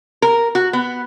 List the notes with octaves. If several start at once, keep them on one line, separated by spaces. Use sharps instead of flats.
A#4
F#4
B3